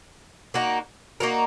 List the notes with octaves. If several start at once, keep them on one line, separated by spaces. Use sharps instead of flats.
A#3 D#4 F#4 A#4
A#3 D#4 F#4 A#4